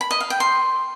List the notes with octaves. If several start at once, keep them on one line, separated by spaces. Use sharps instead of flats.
B5
D#5
F5
G5
C6